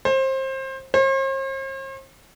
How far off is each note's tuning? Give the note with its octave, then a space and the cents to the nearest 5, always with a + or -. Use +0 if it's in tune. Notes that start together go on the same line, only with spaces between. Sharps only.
C5 +25
C5 +45